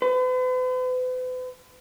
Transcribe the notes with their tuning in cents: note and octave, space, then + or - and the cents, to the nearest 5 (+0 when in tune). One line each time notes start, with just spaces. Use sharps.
B4 +45